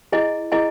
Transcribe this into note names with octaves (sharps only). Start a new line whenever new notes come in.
E4 G#4 D#5 G#5
E4 G#4 D#5 G#5